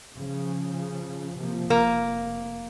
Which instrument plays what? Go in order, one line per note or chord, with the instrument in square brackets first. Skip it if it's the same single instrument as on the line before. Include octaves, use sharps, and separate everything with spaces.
[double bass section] C#3 F3
C3 F3 A#3
[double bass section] F1 [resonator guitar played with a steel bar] A#3